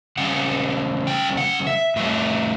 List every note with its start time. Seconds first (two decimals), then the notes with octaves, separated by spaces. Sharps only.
0.17 C#3 G3 F#5
1.07 G5
1.37 F#5
1.67 E5
1.96 A2 G3 E5